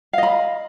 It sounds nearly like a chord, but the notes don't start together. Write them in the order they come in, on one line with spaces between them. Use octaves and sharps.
F5 D#5 B5